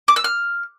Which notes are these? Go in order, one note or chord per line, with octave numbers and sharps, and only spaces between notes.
D6
E6
F6